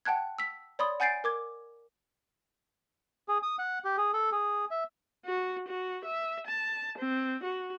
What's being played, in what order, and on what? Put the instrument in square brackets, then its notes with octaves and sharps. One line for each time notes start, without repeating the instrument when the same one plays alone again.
[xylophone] F#5 G5 A5 F#6 G#6
E6 B6
C#5 D5 B5 C6 D#6
F#5 G#5 G6 A6 C7 D7
A#4 D6 G#6
[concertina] G#4
D#6
F#5
G4
G#4
A4
G#4
E5
[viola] F#4
F#4
E5
A5
C4
F#4